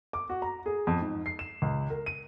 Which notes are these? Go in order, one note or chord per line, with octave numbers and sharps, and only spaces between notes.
D6
F#4
A#5
G#4
F2
G#2
C7
E7
C#2
A#4
D#7